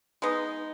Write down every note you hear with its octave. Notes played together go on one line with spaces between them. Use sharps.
G#3 B3 D#4